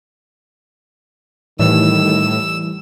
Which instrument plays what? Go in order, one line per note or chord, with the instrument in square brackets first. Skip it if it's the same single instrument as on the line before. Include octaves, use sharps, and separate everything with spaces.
[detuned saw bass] A2 [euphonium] D#3 [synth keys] E3 G3 [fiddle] E6